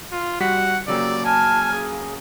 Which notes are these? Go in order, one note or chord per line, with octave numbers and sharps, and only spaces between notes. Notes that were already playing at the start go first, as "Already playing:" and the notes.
F4
G3 F#4 F#5 B6
C#3 F#3 A#3 G4 D5 E6
G#5 A5 F6
G#4